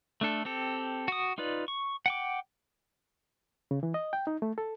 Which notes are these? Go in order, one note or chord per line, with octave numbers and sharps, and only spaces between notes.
A3 D4 A4
C4 G4 A4
F#4 D#6
D#4 F4 B4 D5
C#6
F#5 G5 D6
C#3
E3
D#5
G5
D#4
A3
A4